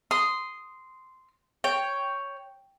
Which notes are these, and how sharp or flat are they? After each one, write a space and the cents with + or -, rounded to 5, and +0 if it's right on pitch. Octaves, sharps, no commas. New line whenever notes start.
C6 -10 D#6 +0
C#5 +5 G5 +0